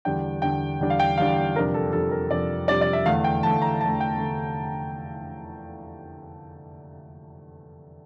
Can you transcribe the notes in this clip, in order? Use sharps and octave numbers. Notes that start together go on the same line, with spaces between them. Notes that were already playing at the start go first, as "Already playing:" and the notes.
E2 D3 G3 D4 G5
E2 D3 G3 D4 G5
E2 D3 G3 D4
F5
G5
E2 D3 G3 D4 F5
F2 C3 G3 D4 A#4
A4
F2 C3 G3 D4 A4
A#4
F2 C3 G3 D4 D5
F2 C3 G3 D4 D5
D5
E5
E2 D3 A3 F5
G5
E2 D3 A3 A5
A#5
E2 D3 A3 A5
G5
D3 A3